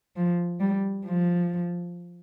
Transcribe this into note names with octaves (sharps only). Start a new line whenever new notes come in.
F3
G3
F3